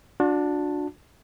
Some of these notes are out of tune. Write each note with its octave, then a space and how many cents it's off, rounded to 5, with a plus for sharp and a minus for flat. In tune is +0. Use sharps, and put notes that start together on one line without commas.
D4 +0 F#4 -40 A5 +0